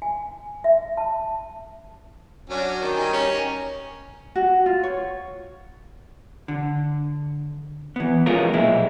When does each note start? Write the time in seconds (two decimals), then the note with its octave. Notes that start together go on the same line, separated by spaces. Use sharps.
0.02 G#5
0.64 E5
0.97 A5
2.50 F#3 C#4 D4 F#4
2.81 D#3
2.95 G3 D#4 G#5
3.13 C#4
3.32 A#4
4.35 F#4
4.66 F4
4.83 C#5
6.48 D3
7.96 E3 B3
8.26 F3 G#3 B3 C#4 F4 A#4
8.53 B1 A#2 G#3 E4